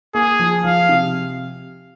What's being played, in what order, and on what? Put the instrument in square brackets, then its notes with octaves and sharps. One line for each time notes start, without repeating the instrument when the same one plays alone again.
[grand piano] A#3 [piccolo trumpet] G#4
[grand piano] F3
[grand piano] F3 [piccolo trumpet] F5
[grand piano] C3